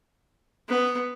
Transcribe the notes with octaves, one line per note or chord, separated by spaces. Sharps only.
B3